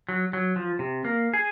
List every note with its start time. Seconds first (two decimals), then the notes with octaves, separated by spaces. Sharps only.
0.09 F#3
0.33 F#3
0.56 F3
0.79 C3
1.05 A#3
1.34 G#4